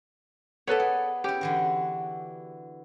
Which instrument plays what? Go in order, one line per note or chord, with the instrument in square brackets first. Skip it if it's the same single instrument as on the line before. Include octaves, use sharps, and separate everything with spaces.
[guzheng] B3 D5 [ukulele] A4 B4 C#5
[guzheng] G#4
[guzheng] C#4 E4 [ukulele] G4
[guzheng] D3 E3 F#4